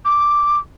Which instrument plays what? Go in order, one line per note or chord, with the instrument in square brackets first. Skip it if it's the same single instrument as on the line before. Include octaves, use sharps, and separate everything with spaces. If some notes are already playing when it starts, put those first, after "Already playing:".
[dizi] D6